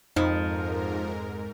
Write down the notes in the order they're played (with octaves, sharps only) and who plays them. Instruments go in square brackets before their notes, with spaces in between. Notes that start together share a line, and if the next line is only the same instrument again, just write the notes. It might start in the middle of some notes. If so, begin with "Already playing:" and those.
[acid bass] F2 [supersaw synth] G#2 A#4 [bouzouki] F3 [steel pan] D#4 B5